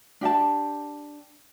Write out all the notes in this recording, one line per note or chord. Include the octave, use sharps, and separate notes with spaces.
D4 G4 G5 A5